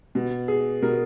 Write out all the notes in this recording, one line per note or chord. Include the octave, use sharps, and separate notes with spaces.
B2
G#4
B2 A#4